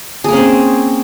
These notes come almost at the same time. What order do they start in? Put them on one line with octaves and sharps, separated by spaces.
G#4 A#3 C#4 C4